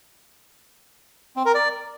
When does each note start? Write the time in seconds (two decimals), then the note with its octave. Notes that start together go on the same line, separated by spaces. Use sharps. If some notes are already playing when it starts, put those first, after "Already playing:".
1.36 C4
1.46 A#4
1.55 D5